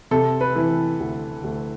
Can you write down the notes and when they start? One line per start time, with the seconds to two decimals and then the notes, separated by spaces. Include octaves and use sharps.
0.11 C3 A4
0.41 B4
0.56 E3
1.00 D2
1.44 D2